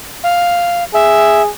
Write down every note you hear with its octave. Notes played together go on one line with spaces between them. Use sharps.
F5
G#4 E5